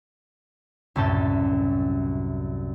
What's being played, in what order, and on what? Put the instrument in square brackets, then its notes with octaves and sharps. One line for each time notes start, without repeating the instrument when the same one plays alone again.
[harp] C2 F#2 A2 C#4 A5 G6